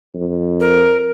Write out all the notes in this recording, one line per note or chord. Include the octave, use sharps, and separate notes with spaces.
F2
A#4